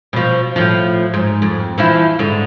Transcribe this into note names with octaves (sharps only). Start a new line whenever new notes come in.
B2 F3
A2 F3
G#2
F2
E3 F3 E4
G#2 D3